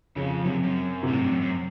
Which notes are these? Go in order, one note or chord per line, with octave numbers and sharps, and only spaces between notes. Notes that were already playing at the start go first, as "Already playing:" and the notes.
F2 C#3
F#2 C3
F#2
A2 C3
G#2
G2
F#2
F#2